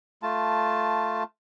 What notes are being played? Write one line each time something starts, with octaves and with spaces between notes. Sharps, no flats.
A3 F4 A5